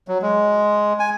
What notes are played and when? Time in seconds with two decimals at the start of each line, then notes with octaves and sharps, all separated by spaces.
0.08 F#3
0.22 G#3
1.00 G#5